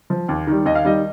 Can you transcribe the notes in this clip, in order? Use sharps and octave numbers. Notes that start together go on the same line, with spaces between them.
F3
D#2
D#3 G3
D#2 D#5
F5
D#3 G3 D#5